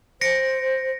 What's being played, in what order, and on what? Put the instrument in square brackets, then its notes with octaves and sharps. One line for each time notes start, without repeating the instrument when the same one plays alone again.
[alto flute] C5 [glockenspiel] A#6 C#7 D7